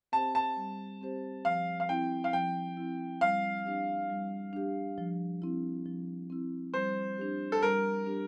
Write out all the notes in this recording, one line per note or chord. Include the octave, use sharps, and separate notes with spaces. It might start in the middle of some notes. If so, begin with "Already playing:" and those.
C4 G4 C5 A5
A5
G3
C4 G4 C5
F3 F5
F5
C4 E4 G5
F5
F3 G5
C4 E4
G3 F5
D4 G4
G3
D4 G4
F3
C4 E4
F3
C4 E4
G3 C5
D4 G4
A4
G3 A#4
D4 G4